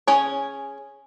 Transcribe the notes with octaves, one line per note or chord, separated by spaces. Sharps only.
C#4 G#4 C#5 G#5